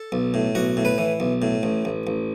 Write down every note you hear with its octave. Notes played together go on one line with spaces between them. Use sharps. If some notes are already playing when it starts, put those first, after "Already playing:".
Already playing: A4
B1
A2
B1 F#4
A2
B4
E3
B1
A2
A1
A1
A1